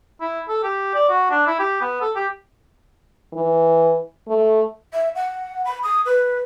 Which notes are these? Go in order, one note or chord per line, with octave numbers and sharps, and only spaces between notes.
E4
A4
G4
D5
F#4
D4
E4
G4
B3
A4
G4
E3
A3
E5
F#5
B5
D#6
B4